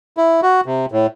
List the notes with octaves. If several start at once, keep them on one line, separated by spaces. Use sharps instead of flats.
E4
F#4
C3
A2